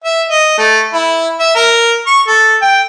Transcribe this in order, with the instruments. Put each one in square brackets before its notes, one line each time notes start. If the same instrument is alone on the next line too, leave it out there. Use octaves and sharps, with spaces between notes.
[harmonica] E5
D#5
A3
E4
E5
A#4
C#6
A4
G5